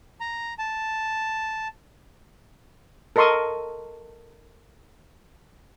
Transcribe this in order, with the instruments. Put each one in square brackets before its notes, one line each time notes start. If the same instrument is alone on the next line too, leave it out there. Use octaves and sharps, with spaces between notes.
[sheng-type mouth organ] A#5
A5
[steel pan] A4 A#4 D#5 C6 C#6 D#6